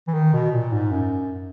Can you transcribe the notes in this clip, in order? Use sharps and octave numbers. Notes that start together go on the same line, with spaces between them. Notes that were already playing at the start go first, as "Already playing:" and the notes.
E3
D#3
B2
A#2
G#2
F#2